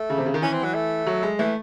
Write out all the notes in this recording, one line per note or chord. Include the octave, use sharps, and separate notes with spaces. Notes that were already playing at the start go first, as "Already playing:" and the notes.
Already playing: A3
C#3
C3
C#3
D#3
E3 C#4
C4
F#3
A3
F#3
G#3
E3 A3